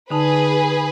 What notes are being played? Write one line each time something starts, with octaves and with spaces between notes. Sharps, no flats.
D3 D#4 G#4 B4 A5